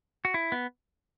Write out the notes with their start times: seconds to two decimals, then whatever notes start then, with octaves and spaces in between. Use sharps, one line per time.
0.25 F#4
0.34 E4
0.52 B3